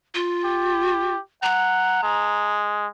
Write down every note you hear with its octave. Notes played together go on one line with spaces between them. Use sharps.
F4
G4
F#5 A#5
G#3